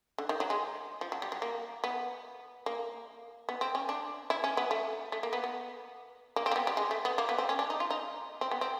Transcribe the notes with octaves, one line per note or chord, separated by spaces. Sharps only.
D3
D#3
F#3
G#3
F3
F#3
G3
F#3
A#3
B3
A#3
B3
C4
C#4
D4
E4
C#4
B3
A3
A3
A#3
B3
B3
A#3
C4
A#3
B3
G3
G#3
A3
B3
A#3
B3
C4
C#4
D4
D#4
F4
D#4
C4
B3
C4